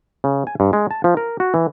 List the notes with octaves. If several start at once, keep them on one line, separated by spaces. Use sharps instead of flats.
C#3
G#5
G2
G#3
A5
F3
A#4
F#4
E3